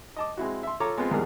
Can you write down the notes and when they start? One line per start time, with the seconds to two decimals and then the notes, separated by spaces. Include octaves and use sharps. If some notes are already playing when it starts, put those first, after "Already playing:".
0.17 D#5 A5 D6
0.37 G#3 C4 E4 F#4
0.63 E5 C6
0.80 F4 A4 C#5 A#5 D6
0.98 G#3 B3 C4 F4
1.11 E2 G#2 B2 G3 G#4 A#4